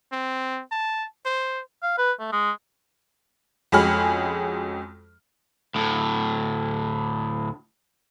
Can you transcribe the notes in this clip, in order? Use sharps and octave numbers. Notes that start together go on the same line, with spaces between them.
C4
A5
C5
F5
B4
A3
G#3
F2 G#3 C#4 F#4 B5 F6
D2 A2